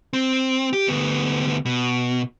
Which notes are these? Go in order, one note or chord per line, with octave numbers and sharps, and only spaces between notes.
C4
G4
D2 B3
B2